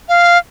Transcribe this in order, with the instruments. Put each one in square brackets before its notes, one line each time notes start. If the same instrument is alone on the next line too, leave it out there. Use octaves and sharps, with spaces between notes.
[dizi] F5